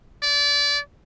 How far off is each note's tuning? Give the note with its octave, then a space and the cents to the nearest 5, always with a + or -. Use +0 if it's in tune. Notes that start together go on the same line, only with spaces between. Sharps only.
D5 -25